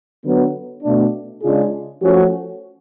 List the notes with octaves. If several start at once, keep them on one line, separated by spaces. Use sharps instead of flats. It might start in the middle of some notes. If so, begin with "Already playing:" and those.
D3 F#3 B3
B2 A3 D4
C#3 G#3 D4 F4 G#4
F3 A3 C#4 F#4